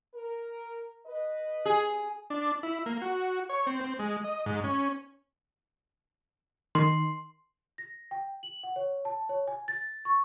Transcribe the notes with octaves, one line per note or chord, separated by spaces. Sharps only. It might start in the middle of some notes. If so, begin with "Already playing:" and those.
A#4
B4 D#5
G#4
D4
E4
A#3
F#4
C#5
C4
C4
G#3
D#5
G#2
C#4
D#3 C6
A#6
G5
F#7
F#5
C#5
A5
C#5
G#5
A6
C#6